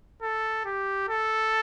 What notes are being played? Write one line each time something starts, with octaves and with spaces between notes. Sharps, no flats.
A4
G4
A4